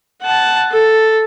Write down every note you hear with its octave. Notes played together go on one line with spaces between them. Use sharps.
F#5 A5
A4